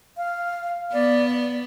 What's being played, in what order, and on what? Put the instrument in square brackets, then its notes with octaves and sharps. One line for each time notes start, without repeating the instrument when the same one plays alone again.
[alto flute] F5
[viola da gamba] B3 [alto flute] D5